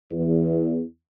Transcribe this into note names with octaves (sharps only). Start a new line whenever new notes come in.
E2